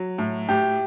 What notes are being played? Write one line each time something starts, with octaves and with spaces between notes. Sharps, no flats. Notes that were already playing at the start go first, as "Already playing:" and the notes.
Already playing: F#3
A2
A2 G4